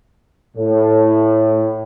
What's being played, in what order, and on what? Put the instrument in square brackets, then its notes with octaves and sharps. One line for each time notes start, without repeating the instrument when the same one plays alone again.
[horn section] A2